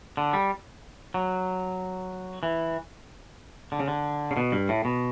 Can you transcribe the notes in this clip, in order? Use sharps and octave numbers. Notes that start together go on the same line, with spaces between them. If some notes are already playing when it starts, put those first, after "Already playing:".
D3
G3
F#3
E3
D3
C#3
D3
C#3
B2
G2
A2
B2